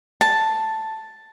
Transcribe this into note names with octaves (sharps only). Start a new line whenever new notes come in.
A5